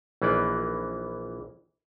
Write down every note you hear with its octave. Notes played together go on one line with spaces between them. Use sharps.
A#1 E3 A#3 B3 D#4 D5